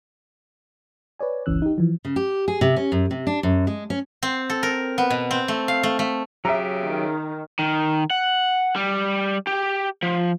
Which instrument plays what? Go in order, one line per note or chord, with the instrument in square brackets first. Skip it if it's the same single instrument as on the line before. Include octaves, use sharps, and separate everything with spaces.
[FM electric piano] B4 C#5 D5 G#5
G1 C#2 E3 C#4 E6 F#6
D#4 G4
E3 F3
[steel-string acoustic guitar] C#3
G4
G#4
C3
C#4
F#2
C3
D4
F#2
G#3
C#4
[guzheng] C4
A4
A#4
B3
B2
C4
A3
F5
A3
A3
[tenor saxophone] C#3 [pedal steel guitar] F#3 G4 [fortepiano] E5 A#5
[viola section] D#3
[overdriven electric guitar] D#3
F#5
G3
G4
F3